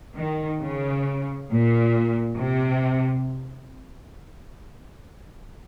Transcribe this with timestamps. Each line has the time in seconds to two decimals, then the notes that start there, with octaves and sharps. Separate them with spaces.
0.16 D#3
0.61 C#3
1.51 A#2
2.41 C3